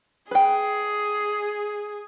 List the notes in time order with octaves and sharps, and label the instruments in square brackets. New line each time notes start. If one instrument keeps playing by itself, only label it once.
[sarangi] G#4 [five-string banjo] B4 G5